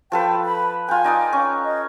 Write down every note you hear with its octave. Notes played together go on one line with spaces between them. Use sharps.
F3 A4 B4 G5
B5
F4 G5 G#5
D#4 D5 D#5
C#4
D#5